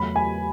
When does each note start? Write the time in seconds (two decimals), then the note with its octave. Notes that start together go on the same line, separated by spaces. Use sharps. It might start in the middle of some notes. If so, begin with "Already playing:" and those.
Already playing: E2 C#3 F#3 A3 B5
0.16 G#5